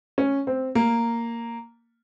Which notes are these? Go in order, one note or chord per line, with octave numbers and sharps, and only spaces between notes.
C#4
C4
A#3